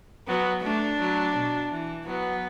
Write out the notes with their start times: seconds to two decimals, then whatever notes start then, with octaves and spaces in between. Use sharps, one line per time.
0.27 F#3 B3
0.63 A3 D4
1.00 F#3
1.36 B2
1.71 E3
2.07 F#3 B3